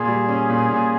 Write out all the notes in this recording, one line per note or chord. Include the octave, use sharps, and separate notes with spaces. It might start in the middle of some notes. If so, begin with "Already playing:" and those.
Already playing: A#2 G#4
G3
C#4
A#2
A#2